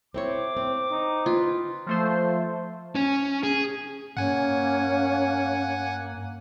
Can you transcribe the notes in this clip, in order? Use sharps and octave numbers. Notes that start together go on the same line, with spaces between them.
C4 E4 C#5 D6
C4
D#4
F4 B4
F3 A3 C5
C#4
G#4
G2 A#3 C#4 F#5 G#5